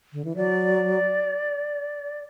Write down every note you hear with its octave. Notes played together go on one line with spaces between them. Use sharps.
D3
E3
F#3 D5